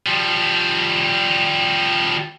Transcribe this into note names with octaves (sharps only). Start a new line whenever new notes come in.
F3 G3